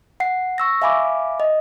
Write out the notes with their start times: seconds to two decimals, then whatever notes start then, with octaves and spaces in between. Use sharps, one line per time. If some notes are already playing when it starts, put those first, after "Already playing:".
0.20 F#5 C7
0.58 C#6 E6 A#6
0.82 E5 F5 G#5 B5 D6
1.40 D#5